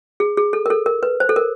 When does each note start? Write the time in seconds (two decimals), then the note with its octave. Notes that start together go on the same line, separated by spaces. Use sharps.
0.20 G#4
0.37 G#4
0.53 A4
0.66 A#4
0.70 A4
0.86 A#4
1.03 B4
1.20 C5
1.29 A4
1.36 A#4